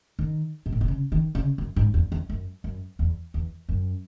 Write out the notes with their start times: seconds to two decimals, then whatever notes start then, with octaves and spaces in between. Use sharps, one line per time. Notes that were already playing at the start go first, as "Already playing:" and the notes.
0.19 D#3
0.66 G#2
0.72 A2
0.81 B2
0.88 C#3
1.12 D#3
1.35 C#3
1.58 F#2
1.76 G#2
1.94 E2
2.12 E2
2.30 F#2
2.64 F#2
2.99 E2
3.34 E2
3.69 F#2